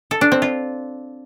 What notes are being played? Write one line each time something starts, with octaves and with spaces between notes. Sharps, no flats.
A4
D4
C4
F4